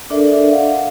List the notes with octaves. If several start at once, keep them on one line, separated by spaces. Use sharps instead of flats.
D4 A4 A#4 D5 E5
F5 F#5